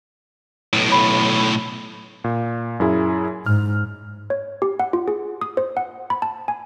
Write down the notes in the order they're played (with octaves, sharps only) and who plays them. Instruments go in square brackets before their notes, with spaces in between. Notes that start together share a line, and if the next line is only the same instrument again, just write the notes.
[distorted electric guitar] B1 A2
[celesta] B5
[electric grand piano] A#2
F#2 E4 G#4
[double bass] G#2 [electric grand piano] F6
[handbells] C#5
G4
F#5
F4
G#4
D#6
C5
F#5
B5
A5
G#5